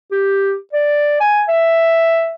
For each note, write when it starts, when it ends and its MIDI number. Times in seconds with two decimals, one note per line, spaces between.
0.11 0.54 67
0.73 1.18 74
1.20 1.43 80
1.49 2.35 76